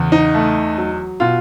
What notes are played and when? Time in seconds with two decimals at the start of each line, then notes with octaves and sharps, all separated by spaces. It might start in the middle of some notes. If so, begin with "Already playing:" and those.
Already playing: E2 C#3
0.12 D#4
0.34 A3
0.78 F#3
1.20 B2 F4